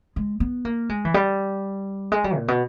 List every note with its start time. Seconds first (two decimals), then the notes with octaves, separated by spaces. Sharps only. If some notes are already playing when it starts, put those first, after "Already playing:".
0.16 G#3
0.40 B3
0.65 A#3
0.89 G#3
1.05 E3
1.14 G3
2.12 G#3
2.24 G3
2.36 A#2
2.48 B2